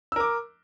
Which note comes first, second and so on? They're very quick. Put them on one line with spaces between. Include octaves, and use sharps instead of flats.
E6 A#4 D6